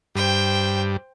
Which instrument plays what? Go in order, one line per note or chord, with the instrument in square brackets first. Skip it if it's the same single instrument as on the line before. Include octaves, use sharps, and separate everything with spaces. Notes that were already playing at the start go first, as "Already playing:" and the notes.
[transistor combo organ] G2 [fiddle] C5 G5